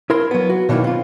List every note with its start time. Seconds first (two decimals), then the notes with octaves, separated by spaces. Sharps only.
0.10 E4 A#4 C6
0.31 F#3 B3
0.50 F#4
0.69 B2 D#3 F#3 A#3 E4
0.84 C4 F4